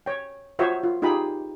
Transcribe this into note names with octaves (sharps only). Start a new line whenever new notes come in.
C#5 G5
F4 F#4 C5 C#5 D#5 E5
F4
D#4 F4 G4 G#4 B5